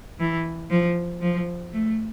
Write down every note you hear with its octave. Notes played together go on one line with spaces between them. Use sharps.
E3
F3
F3
A3